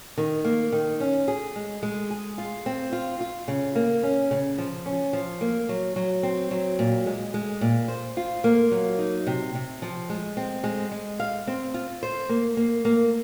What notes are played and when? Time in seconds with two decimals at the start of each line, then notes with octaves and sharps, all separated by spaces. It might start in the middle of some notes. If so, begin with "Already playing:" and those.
0.18 D#3
0.44 A#3
0.72 D#3
1.00 C#4
1.28 G#4
1.56 G#3
1.83 G#3
2.10 G#4
2.38 F4
2.66 C4
2.92 F4
3.20 F4
3.48 C#3
3.75 A#3
4.03 C#4
4.31 C#3
4.58 F3
4.86 C#4
5.13 F3
5.41 A#3
5.69 F#3
5.96 F#3
6.23 C4
6.51 F#3
6.79 A#2
7.06 G#3
7.34 G#3
7.61 A#2
7.88 C5
8.17 F4
8.44 A#3
8.71 F#3
8.98 D#4
9.27 C3
9.55 C3
9.82 F3
10.10 G#3
10.37 C4
10.64 G#3
10.91 G#3
11.20 F5
11.47 C4
11.74 F4
12.03 C5
12.29 A#3
12.57 A#3
12.85 A#3